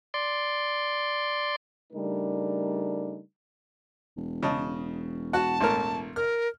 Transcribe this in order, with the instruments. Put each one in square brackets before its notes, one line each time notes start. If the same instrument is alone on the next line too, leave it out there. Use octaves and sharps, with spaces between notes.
[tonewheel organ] D5 C6
[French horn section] C#3 G3 A3 D4 D#4 A#4
[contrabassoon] E1
[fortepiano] C#3 D#5 A5
[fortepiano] F#4 F#5 [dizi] A5
[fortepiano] A1 A3 A#4
[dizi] A#4 [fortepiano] F6